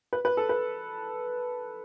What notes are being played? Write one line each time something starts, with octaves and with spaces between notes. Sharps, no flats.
B4
B4
A4
B4